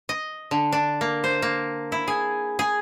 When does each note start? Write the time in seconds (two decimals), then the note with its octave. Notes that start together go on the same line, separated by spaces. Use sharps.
0.09 D#5
0.51 D3
0.72 D4
1.01 A#3
1.24 C5
1.42 A#3
1.92 E4
2.08 G#4
2.59 G#4